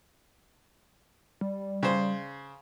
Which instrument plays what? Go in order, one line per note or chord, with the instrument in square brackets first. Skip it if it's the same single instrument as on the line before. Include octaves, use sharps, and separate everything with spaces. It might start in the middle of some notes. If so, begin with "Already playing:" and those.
[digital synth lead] G3
[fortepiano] C#3 C5